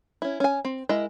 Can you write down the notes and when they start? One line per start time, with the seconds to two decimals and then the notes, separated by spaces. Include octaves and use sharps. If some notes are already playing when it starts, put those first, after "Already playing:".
0.22 C#4 E4
0.40 C#4 G#5
0.65 C4
0.89 G#3 E4 A#4 D#5